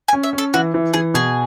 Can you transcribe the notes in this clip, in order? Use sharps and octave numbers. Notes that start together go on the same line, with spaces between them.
G#5
C#4
E5
C#4
A4
E3 F#4
E3
E3 G#4
B2 G#4